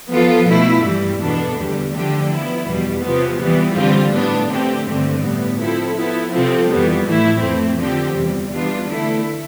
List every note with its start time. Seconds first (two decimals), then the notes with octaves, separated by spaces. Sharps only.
0.11 F3 B3 F4 A4
0.47 B2 A3 E4
0.84 G2 E3 G3
1.20 E2 B2 B3 D4 A4
1.58 E2 D3 G3
1.93 D3 F3 A3 D4 G4
2.30 F3 B3 E4
2.66 E2 B2 G3
3.03 C3 F3 B3
3.40 E3 G3 B3
3.76 D3 G3 C4 F4
4.13 A2 G3 B3 D4
4.49 D3 A3 C4 G4
4.87 G2 D3 A3 C4
5.22 A2 G3 B3
5.59 F3 C4 E4 A4
5.96 F3 B3 E4
6.33 C3 F3 C4 F4 A4
6.70 F2 E3 G3 B3
7.06 A2 E3 A3 E4
7.42 F2 E3 A3 C4
7.79 D3 F3 C4 G4
8.16 E2 C3 G3
8.52 E3 G3 B3 D4 F4
8.89 D3 A3 E4 A4